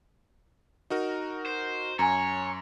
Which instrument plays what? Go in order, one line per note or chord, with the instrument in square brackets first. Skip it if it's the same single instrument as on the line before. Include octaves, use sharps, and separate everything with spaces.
[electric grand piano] D#4 F#4 A#4
[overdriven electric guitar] C5
[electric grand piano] F#2 [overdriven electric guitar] C#5 [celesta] G#5 A#5